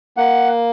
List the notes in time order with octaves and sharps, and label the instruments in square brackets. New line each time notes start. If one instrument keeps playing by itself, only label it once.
[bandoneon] A#3 F#5